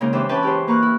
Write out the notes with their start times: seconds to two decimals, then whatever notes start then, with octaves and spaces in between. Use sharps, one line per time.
0.01 A#2 C#3 G#3 D#4
0.13 E3 C4 D4 G4 C5 E5
0.29 E3 C#4 B4 G5 A5 B5
0.43 E4 G4 G#4 C5
0.67 A#3 B4 A#5 C#6 F6 F#6
0.82 E4